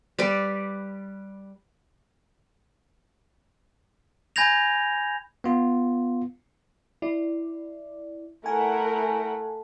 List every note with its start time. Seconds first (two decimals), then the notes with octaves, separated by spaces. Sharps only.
0.19 G3 B4 D5
4.36 G#5 B5 G6 G#6 A#6 F7
5.44 B3 F4
7.02 E4 D5
8.46 A3 E4 A#4 F#5 G#5